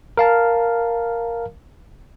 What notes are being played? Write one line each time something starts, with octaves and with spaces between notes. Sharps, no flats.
A#4 F5 A5